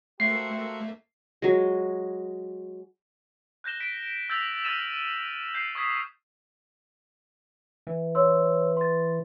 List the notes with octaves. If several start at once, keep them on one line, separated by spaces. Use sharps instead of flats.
A3 A#3 F#4 G4 C5 E5 C7
F#3 G#3
F#6 G6 A#6 E7 G7
B6 D7
E6 G6 A6 B6 F7
E6 F6 A6 D#7 E7
G6 C7
C#6 D#6 G#6 B6
E3
C#5 C6 E6
C6 A6